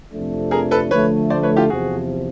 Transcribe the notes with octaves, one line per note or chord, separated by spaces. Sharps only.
F2 C3 F3 A3 D4
G#4 A#4
A4 B4
D3 F3 A3 B4 C#5
C5 D5
B4 C#5
F4 G4
E2 C3 F3 F#4 G#4